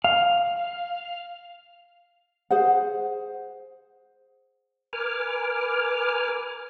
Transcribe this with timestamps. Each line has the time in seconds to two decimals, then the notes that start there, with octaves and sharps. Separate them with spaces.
0.04 F5
2.51 G#4 C5 F#5
4.93 A#4 B4 G#5 D6 F6